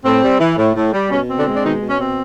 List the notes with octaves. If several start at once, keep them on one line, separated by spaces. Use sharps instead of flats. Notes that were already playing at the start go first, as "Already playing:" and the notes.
A2 C4
G3
E3
A2
A2
G3
B2 C#4
C4
D3 D4
G#3
D4
B2 D#3 D#4
B2
C#4
C4